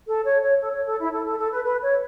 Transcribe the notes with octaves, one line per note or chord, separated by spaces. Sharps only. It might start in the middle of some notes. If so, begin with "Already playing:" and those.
A4
C#5
C#5
A4
C#5
A4
E4
A4
A4
A4
B4
B4
C#5